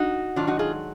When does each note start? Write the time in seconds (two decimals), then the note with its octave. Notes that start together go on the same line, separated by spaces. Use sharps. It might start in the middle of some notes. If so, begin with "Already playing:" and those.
Already playing: D#4 F#4
0.36 G#2 D#3 F#3 D4 F4
0.47 D#4 F#4
0.59 F4 G#4